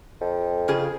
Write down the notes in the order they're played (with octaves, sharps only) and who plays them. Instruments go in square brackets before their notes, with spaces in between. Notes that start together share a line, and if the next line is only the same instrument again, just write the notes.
[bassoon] F2
[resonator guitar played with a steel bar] C#3 F4 G#4